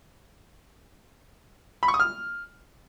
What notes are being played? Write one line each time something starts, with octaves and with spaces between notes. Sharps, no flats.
B5
C#6
D#6
F6